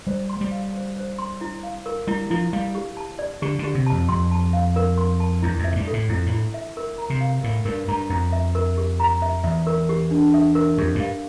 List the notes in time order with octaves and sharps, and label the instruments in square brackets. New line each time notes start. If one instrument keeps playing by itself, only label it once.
[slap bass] G3 [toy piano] C5
[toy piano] C6
[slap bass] G3
[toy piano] F5
C5
C5
C6
E4
F5
A#4
[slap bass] G3 [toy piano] E4
[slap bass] F3 [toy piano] E4
[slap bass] G3 [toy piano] F5
[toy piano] G4
A5
D5
[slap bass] D3 [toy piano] G4
[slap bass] D3
[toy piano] G4
[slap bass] C3
[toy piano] A5
[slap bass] F2
[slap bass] F2 [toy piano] C6
[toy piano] A5
F5
A#4
C6
A5
[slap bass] E2 [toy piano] E4
[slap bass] F2
[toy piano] E5
[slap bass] A2
G2
[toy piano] A4
[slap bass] A2
[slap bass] F2 [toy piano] E4
[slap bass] A2
[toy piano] E4
E5
A#4
A#5
[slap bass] C3
[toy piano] F5
[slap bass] A2 [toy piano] A#4
[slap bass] G2 [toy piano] A#4
[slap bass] G2 [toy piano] A#5
[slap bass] F2 [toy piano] A#5
[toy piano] E5
A#4
G4
A#5
E5
[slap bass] E2 [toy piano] E5
[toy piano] A#4
G4
D4
E5
A#4
[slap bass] F2 [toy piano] G4
[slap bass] G2 [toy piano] F5